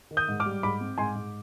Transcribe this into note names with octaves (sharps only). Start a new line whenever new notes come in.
D#3
D#6 G6
G#2
D6 F6
G3
G#2 B5 D6
C4
G#2 G#5 C6
G#2